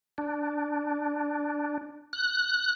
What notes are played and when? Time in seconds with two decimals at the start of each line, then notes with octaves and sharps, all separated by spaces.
0.18 D4
2.13 F#6